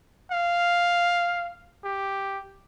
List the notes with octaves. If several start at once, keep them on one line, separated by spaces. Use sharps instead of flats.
F5
G4